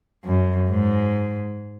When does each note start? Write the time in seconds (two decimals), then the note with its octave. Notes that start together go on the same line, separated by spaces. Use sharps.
0.25 F#2
0.70 G#2